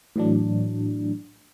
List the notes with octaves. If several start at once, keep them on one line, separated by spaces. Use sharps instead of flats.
A2 E3 F#3 D4